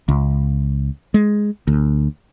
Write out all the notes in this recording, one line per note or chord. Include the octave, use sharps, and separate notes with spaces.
C#2
G#3
D2